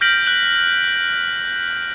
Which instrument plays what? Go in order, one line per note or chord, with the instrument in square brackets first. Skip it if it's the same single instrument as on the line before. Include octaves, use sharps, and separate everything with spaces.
[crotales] F6 G6 A#6 B6 D7 F#7
F#6 F#7